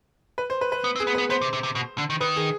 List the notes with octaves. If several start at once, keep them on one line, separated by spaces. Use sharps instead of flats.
B4
C5
B4
B4
B3
C4
G#4
B3
B4
B3
B3 C5
C3
C3
C3
B2
D3
D#3
D#3 B4
G#4